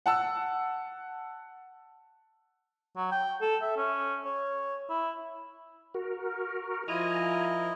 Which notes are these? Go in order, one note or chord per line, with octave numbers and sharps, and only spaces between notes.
F#5 A5 E6
F#3
G5
A4
E5
C#4
C#5
E4
F#4 A#4
F3 E4 F4 A#4 D#5 G#5 A#5